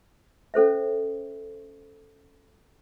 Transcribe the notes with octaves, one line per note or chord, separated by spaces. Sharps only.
C#4 A4 C5 E5